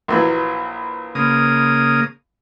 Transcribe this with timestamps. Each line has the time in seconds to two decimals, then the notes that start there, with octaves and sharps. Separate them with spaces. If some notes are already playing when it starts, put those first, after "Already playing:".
0.08 A#1 E3 F#3
1.15 C#3 A#3 D#6